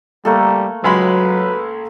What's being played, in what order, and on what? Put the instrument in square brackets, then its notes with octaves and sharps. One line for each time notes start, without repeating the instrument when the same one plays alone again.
[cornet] G3 [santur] A3 A#3 A4
[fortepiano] C#2 G#3 B5 [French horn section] F#3 [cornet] B4